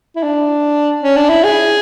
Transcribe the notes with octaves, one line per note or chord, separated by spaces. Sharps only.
E4
D4
C#4
D4
E4
G#4